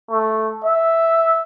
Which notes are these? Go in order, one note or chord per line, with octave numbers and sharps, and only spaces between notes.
A3
E5